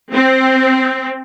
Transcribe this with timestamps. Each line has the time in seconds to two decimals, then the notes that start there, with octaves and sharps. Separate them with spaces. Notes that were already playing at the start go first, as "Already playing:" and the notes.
0.13 C4